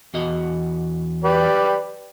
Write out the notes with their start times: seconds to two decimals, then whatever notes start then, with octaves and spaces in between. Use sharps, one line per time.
0.14 E2 F#4 D#5
1.24 G4 B4 D5